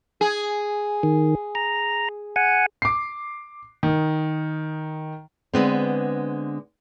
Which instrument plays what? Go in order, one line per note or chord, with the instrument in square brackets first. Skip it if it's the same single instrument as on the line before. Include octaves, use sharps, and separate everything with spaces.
[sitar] G#4
[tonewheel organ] D#3
A#5
F#5 G#5
[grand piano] D6 C7
D#3
[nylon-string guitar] D3 G#3 B3 C4